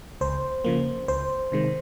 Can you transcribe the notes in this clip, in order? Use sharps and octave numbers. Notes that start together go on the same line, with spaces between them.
C#2 C5
C#3 F3 A#3
C#2 C5
C3 D#3 G#3